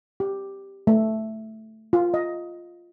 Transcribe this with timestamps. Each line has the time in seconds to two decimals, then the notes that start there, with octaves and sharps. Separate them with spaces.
0.20 G4
0.87 A3
1.93 F4
2.14 D#5